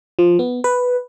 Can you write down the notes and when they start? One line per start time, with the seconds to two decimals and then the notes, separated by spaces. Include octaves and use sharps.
0.19 F3
0.39 B3
0.64 B4